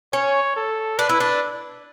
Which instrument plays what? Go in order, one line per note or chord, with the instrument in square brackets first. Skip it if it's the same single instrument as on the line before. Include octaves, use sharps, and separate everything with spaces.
[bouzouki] C#4 [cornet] C#5
[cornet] A4
[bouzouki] D4 [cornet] B4
[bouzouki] E4
D4